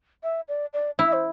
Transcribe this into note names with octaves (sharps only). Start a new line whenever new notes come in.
E5
D5
D5
E4 E5
C5